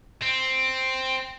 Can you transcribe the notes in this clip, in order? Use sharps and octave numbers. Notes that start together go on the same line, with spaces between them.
C4